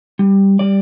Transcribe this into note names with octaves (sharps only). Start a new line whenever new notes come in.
G3
G3 D5